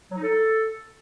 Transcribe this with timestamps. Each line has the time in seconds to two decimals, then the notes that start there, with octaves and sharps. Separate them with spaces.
0.11 F#3
0.17 D#4
0.23 A4